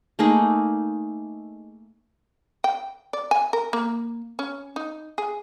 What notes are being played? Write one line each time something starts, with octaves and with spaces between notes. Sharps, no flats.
A3 A#3 D#4 G#4
G5
D5
G#5
A#4
A#3
C#4
D#4
G#4